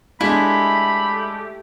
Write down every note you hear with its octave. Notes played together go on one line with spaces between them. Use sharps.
G#3 A3 D4 E4 G4 B5